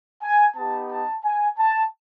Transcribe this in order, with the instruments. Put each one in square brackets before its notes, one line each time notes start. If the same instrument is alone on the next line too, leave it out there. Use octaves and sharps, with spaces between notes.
[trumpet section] G#5
B3 D#4 G4 A5
A5
G#5
A5